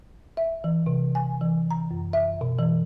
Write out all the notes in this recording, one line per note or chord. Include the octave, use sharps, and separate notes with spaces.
E5
E3
C3
G#5
E3
A#5
F#2
E5
B2
E3